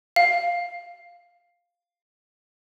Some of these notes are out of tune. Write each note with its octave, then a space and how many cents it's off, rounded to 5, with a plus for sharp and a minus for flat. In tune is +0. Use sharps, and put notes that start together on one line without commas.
F5 +0